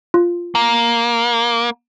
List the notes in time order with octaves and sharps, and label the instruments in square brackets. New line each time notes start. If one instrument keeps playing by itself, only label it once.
[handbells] F4
[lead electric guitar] A#3